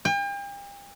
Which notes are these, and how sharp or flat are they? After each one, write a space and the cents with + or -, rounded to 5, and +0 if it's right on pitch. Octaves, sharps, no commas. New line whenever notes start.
G5 +40